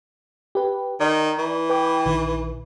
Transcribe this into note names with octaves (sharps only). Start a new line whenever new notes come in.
G4 B4
D#3 D5
E3
B4 G5 D6
A#1 D#3